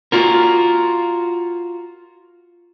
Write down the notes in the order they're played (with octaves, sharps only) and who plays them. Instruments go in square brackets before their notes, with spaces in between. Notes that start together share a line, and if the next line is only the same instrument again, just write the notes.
[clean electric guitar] F4 F#4 A#4